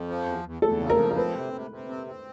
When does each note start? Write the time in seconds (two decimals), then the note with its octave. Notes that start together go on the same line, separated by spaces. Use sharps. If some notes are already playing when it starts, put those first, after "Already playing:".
Already playing: F2
0.08 F3
0.26 E2
0.45 E2
0.62 E2 A4
0.80 C#3
0.90 A#4
0.98 F3
1.11 A#4
1.16 C4 B4
1.34 C3
1.53 C3
1.70 C3
1.89 C4
2.07 C4